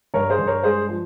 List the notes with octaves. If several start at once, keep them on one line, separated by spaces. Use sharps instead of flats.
G2 A#4 C#5
G#4 C5
G2
A#4 C#5
G#3 G#4 C5
F3